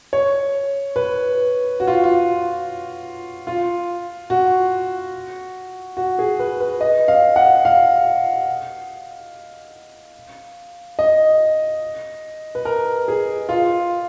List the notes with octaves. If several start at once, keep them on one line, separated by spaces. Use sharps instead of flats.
C#5
B4
F#4
F4
F4
F4
F#4
F#4
G#4
B4
B4
D#5
F5
F#5
F5
D#5
B4
A#4
G#4
F4